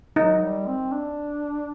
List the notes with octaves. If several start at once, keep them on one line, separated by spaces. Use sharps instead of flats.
F#3 D#4
G3
C4
D4